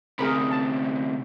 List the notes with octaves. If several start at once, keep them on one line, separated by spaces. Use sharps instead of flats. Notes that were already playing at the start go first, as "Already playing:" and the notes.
D2 C3 G#4 A#4 B5
A5